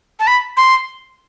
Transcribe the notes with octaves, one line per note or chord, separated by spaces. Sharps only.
A5
B5
C6